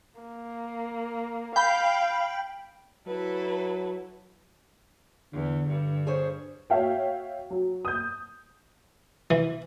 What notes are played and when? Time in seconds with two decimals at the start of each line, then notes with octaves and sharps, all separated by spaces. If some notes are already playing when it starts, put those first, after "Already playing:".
0.21 A#3
1.56 F5 G5 B5
3.07 F#3 E4 A4 B4
5.33 E2 D3
5.68 G2
6.07 G#4 C5 C#5
6.70 F#4 C#5 E5 F5 G5
7.50 F#3
7.85 D#6 G6
9.31 E3